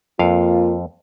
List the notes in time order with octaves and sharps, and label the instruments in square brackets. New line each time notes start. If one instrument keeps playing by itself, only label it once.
[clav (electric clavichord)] F2 F5 [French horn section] A#3 F4